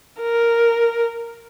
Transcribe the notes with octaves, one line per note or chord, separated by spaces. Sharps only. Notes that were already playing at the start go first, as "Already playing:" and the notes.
A#4